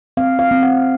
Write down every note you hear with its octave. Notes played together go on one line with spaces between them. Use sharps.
C4 F5
F5
C4
F#5